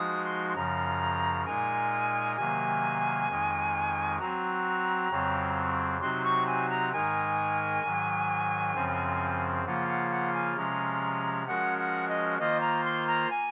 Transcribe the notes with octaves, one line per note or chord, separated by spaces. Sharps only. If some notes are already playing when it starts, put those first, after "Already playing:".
Already playing: F3 G#3 D#4 F#4 D#6
C6
C6
F#2 C#3 F3 A#5
A#2 G#3 D#4 A#4 G#5
C3 D#3 F#3 A#3 G#5
F2 D#3 G#3 D#4
F#3 C4 F#4 A#5
F2 C#3 F#3 C4
C3 F#3 C4 D#4 F#4 C6
C#6
G#5
A#5
G#2 D#3 G#3 D#4 A#4 G#5
G#2 D#3 F#3
F#2 C#3 F3 C4
C#3 F3 A#3 F4 F#5
F#5
F#5
G#5
C3 F3 G#3 C#4 A#5
F3 G#3 C#4 F#4 A#4 F#5
F#5
D#5
D#3 A#3 F4 C5 D#5
A#5
C6
A#5
G#5